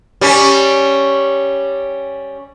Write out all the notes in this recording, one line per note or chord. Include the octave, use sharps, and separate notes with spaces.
G3 C#4